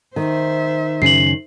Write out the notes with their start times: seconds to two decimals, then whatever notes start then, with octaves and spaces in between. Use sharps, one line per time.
0.16 D#3 C5 E5
1.02 F#2 C#3 C#4 C7 F#7